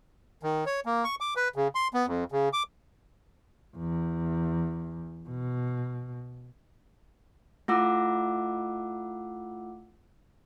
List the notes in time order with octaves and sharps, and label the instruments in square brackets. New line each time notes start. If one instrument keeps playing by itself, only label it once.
[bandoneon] D#3
C#5
A#3
C#6
D6
B4
C#3
C6
B3
F2
C#3
D6
[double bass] E2
B2
[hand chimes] A3 E4 F4 F#5 D6 E6